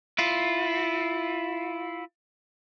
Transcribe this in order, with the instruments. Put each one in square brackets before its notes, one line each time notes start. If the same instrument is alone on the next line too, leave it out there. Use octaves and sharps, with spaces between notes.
[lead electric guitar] E4 F4